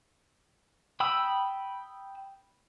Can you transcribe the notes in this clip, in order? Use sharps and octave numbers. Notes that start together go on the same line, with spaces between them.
G5 B5 D#6 E6